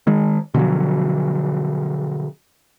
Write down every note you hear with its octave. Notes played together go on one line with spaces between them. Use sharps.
D#3 G#3
B2 D3 F3 F#3